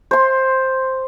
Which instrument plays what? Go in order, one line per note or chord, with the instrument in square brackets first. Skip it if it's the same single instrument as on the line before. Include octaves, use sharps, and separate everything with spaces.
[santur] C5 C6